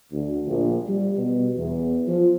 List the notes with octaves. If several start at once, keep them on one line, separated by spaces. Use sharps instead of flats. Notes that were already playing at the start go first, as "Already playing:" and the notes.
D2
A#1
G3
B2
E2
F3